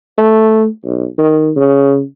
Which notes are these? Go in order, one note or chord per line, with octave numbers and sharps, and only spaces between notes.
A3
B1
D#3
C#3